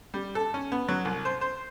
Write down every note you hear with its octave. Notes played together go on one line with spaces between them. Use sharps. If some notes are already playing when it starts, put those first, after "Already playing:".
G3
A4
C#4
B3
F#3
C2
C5
C5